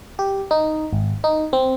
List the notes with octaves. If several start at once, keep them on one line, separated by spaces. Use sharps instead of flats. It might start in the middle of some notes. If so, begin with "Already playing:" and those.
G4
D#4
G#1
D#4
C4